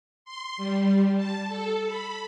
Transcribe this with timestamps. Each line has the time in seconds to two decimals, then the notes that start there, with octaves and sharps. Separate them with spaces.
0.25 C6
0.57 G3
1.16 A5
1.48 A4
1.86 B5